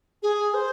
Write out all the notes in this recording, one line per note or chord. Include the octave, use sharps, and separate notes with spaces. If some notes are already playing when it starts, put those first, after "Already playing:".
G#4
C5